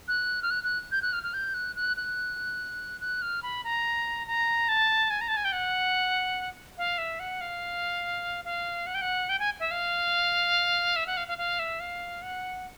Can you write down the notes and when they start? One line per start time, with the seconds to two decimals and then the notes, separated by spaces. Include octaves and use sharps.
0.08 F#6
0.42 F6
0.51 F#6
0.64 F#6
0.92 G6
1.02 F#6
1.13 F6
1.23 F6
1.34 G6
1.54 F#6
1.76 F#6
1.97 F#6
3.01 F#6
3.22 F6
3.43 B5
3.64 A#5
4.27 A#5
4.69 A5
5.10 G#5
5.21 A#5
5.28 A5
5.37 G#5
5.45 G5
5.52 F#5
6.78 F5
6.98 E5
7.20 F#5
7.41 F5
8.45 F5
8.87 F#5
8.95 G5
9.01 F#5
9.29 G5
9.39 G#5
9.60 E5
9.71 F5
10.96 E5
11.07 F#5
11.17 F5
11.28 F5
11.38 F5
11.59 E5
11.80 F5
12.22 F#5